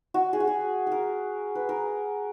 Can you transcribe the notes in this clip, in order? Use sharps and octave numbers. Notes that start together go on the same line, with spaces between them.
F#4
G#4
F#4
G#4
G#4 A#4
B4
A#4